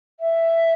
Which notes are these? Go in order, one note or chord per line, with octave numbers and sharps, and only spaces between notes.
E5